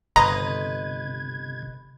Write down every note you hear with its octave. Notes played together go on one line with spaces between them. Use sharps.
G1 C3 B4 D#5 A#5 C6 G#6